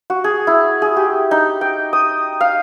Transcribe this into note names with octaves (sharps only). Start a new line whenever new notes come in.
F#4
G#4
E4
G#4
G4
D#4
G5
D#6
F5